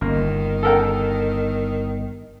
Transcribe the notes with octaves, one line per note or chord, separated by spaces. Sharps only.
G1 D#3 A#3
A4 A#4 G5